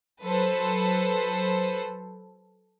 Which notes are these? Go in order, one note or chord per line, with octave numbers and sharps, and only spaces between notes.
F#3 A4 B4 C5